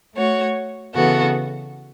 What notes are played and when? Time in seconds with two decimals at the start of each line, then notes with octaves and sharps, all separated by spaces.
0.14 A3 F#4 C#5
0.94 C#3 E3 B3 F#4 A4